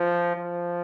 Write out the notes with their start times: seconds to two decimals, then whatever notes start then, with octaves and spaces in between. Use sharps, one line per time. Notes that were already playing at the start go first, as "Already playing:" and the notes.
Already playing: F3
0.37 F3